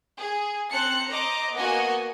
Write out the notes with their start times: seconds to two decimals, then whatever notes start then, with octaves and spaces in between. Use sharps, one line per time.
0.18 G#4
0.71 C4 C5 A5 F#6 C#7
1.09 C5 D#5 A#5 D6
1.55 A#3 B3 F#4 D#5 G#5